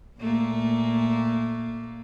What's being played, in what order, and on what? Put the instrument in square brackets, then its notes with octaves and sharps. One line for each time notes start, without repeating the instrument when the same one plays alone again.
[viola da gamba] A#2 A3 A#3